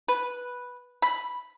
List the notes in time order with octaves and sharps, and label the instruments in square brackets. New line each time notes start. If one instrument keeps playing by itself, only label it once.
[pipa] B4
B5